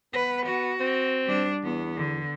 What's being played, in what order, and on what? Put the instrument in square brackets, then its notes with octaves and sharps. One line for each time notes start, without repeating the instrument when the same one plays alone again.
[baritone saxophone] B3 [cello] B4
[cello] F#4
[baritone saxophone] C4
[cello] G3 D4
[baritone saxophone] E2 [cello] B3
[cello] D3